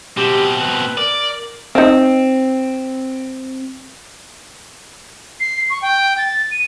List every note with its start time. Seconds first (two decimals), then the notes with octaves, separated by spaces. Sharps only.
0.17 B2 C4 G4
0.61 B4
0.98 A#4 D5
1.75 C4 D#4 D#5 F5
5.40 C7
5.70 C#6
5.82 G5
6.18 A6
6.51 D#7